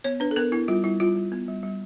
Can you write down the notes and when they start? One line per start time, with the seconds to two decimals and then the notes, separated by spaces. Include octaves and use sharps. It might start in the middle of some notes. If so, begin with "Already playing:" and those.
0.04 B3 C#5
0.20 D4 B4
0.31 A4
0.36 B3 A#4
0.52 B3 E4
0.68 G3 F4
0.84 G3 E4
1.00 G3 F4
1.16 G3
1.32 B3
1.48 G3
1.63 G3